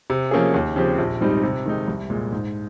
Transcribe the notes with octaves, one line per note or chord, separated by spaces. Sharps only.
C3
F3 A#3 C#4 G#4
D#2
C#3 F3 C4 G4
A#1
G#2 G3 C4 D#4
C3
D#3 G#3 D#4
C2
A#2 G#3
G#2